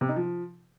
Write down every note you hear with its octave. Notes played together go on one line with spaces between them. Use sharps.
C3
D#4
F3